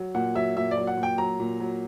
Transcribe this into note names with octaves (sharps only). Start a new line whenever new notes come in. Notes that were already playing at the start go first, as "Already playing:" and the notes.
Already playing: F#3
A#2 F#5
F#3 E5
A#2 E5
D5
F#3
F#5
A#2
G5
F#3 A#5
A#2
F#3